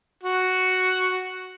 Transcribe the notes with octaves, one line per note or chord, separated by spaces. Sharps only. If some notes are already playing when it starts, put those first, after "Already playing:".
F#4